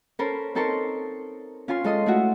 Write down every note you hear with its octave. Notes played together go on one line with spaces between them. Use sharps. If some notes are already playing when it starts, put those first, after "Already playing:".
C#4 A4 A#4 C5 B5
C4 D#4 A4 A#4 C6 C#6
C#4 F4 G#5 C6
G#3 A4 D#5 C6 D#6
A3 E4 F#4